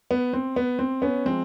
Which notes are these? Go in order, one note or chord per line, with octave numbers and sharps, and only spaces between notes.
B3
C4
B3
C4
B3 C#4
F3 G#3 C4